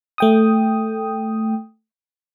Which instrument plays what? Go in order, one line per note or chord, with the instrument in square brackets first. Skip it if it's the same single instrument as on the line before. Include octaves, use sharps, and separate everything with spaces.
[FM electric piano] A3 G5 D#6